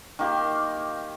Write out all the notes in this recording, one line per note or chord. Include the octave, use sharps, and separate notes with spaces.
D#3 A#3 G4 C6